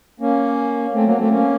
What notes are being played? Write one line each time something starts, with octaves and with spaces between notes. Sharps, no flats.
A#3 C#4
A3 C4
F#3 A#3
A3 C4
A#3 C#4